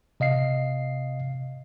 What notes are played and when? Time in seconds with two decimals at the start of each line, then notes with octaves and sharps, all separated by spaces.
0.20 C3 D#5 F5 C7